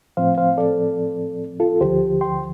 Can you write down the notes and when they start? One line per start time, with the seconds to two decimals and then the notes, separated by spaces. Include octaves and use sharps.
0.17 A2 F3 C4 C5 F5
0.38 C5 F5
0.57 A4 D5
1.60 F4 A4
1.81 D2 D3 F3 G4 C5
2.21 G5 C6